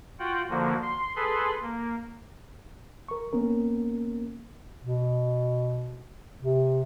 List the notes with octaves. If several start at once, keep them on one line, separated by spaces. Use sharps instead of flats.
F4 F#4 F#5 G5
D3 F3 A#3 F#4
C6
G#4 A4 B4 B5 C6
A#3
A#4 C#6
A#3 B3 C#4 A#4
B2
C3